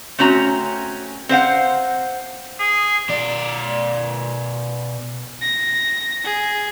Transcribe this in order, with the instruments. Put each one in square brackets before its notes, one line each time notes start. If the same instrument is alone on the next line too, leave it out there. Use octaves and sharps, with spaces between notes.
[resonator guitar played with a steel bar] A3 C4 C#4 F#4 A#5
C4 C5 F5 F#5
[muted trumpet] G#4
[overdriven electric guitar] B2 D5
[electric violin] A#6
G#4